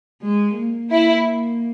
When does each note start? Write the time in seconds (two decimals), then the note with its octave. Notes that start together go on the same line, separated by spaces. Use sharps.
0.22 G#3
0.57 A#3
0.91 E4